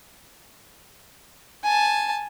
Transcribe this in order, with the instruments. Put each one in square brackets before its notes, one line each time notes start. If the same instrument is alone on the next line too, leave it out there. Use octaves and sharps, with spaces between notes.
[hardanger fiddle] G#5 A5